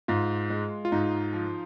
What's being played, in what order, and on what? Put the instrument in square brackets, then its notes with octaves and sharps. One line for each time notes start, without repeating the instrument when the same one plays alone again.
[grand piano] G#2 [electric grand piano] F4
[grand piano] G#3
[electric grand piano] F4
[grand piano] G#2 [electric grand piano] D#4
[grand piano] F3